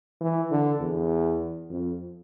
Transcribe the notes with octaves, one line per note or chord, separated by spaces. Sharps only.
E3
D3
E2
F2